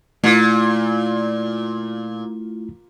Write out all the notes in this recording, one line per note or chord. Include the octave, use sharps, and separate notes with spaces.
A#2 A3 E4 F4